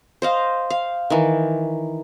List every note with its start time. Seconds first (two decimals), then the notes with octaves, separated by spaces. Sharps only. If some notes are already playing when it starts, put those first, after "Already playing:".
0.22 C5 D#5 F5
0.70 F5
1.10 D#3 E3